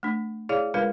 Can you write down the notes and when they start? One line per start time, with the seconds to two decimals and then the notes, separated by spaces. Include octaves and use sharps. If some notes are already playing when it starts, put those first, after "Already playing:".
0.03 A3 D4
0.49 E4 G#4 C#5 D5 F5
0.74 G#3 D4 F4 A#4 B4 F5